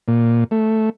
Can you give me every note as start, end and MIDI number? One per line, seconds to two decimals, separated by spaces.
0.08 0.44 46
0.51 0.90 57